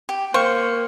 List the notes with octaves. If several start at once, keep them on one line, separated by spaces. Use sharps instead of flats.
G4
A#3 C5 F5 C#6 F6